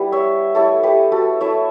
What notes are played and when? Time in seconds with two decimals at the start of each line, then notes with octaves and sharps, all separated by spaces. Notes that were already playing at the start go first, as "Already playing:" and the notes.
Already playing: G3 B3 E4 B4
0.12 C#5 E5
0.55 A3 E4 A4 C#5
0.83 G4 B4
1.12 F#4 A4
1.40 A3 E4 C#5 E5